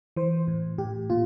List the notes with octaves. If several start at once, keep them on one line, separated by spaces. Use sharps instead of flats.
E3 C5
A2
A2 G4
A#2 F4